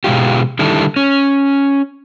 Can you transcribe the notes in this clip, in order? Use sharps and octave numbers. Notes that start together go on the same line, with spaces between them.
B2 G#3 D#4 F4 G4
D3 D#3 G3 E4 A4
C#4